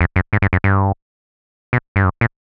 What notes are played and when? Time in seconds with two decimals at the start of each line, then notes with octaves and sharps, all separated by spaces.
0.01 F2
0.16 F#2
0.33 G#2
0.42 G2
0.53 F#2
0.64 G2
1.73 B2
1.96 G2
2.04 F#2
2.21 A#2